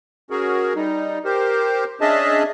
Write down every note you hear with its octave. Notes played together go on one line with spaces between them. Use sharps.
C#4 F#4 G#4 A#4
G3 D#4
G4 A#4 C5
C#4 D4 G#4 D#5 E5 A5